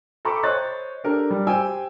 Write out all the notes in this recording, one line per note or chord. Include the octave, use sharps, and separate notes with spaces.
A4 G5 A#5 B5 C#6 D6
C5 C#5 D#5 C#6 F#6 A6
D4 G4 A4 A#4
G3
G4 C5 G5 G#5 E6